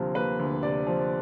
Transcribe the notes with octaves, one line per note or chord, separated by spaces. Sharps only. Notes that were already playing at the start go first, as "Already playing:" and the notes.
Already playing: D2 C3 F3 A#3
A#3 B4
D2
C3 D5
F3